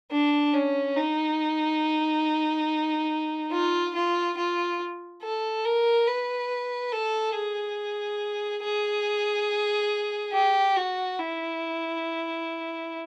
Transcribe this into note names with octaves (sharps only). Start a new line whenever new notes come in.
D4
C#4
D#4
F4
F4
F4
A4
A#4
B4
A4
G#4
G#4
G4
F#4
E4